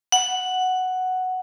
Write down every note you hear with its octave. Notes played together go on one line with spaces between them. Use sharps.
F#5